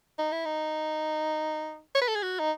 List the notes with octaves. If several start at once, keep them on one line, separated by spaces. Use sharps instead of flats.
D#4
E4
D#4
C#5
B4
A4
G#4
F#4
D#4